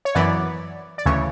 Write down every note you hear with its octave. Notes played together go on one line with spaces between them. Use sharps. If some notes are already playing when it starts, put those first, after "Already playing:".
C#5
F#2 E3 B3 D5
D5
D2 C#3 E3 C#5